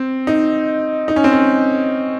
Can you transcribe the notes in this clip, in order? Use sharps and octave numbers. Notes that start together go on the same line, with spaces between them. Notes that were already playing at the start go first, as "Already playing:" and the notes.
Already playing: C4
D#4
D#4
C#4
C4
C#4